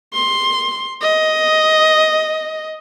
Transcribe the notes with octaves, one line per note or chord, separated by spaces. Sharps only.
C6
D#5